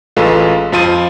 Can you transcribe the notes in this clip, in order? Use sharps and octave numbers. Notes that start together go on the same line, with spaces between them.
A1 G#3 F4 A4 B4
F2 F3 F4 C5 D#7